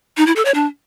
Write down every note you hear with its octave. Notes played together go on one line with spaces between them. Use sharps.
D#4
E4
A4
C#5
D4